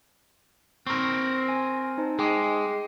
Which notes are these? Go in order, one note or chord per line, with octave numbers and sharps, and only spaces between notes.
C4 A#4 C#6
G#5
D#4 C5 A5
G#3 G#4 G5 D6